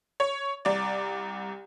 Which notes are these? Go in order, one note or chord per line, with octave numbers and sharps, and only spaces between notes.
C#5
C2 D5